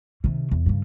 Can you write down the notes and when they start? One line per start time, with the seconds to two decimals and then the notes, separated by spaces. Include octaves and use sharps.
0.24 C3 D#3
0.51 E2
0.66 G2 C#3